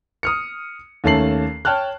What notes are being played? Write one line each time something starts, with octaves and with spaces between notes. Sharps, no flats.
D#6 F6 C#7
D#2 A3 C#4 A5 C7 F#7
C#5 G5 A5 F6 F#6